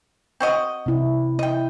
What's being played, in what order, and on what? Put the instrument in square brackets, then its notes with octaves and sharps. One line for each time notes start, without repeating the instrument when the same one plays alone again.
[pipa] C4 F#4 D#5
[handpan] C3 E4
[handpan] E4 [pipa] D#5 G5